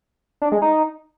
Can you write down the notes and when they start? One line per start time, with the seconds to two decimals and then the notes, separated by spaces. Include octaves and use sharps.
0.42 D4
0.52 G#3
0.62 D#4